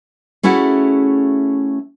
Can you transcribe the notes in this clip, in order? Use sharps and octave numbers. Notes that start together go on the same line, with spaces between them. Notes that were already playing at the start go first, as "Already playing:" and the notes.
A3 C#4 E4 F#4 G#4